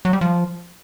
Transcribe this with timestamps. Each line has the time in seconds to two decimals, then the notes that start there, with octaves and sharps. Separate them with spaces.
0.05 F#3
0.13 G3
0.21 F3